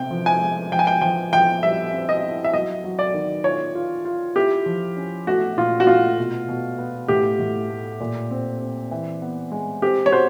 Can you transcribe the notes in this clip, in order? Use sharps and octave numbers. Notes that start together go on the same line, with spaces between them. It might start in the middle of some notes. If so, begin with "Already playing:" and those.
Already playing: C3 C4 G5
F3
G#5
G#3
F3 G5
G#5
G5
F3 G5
F3 G5
G3 E5
C4
D#5
E4
E5
F#3 D#5
F#3
D5
D#3
F4 C#5
F4
F4
E4 G4
F3
C#4
A3 F#4
A#2 F4
F#4
A3 F4
B2
B2
B3
A2 G4
A2
A3
A#2
C4
C4
E3
B3
G#3
C4 G4
C#5
F#4 C5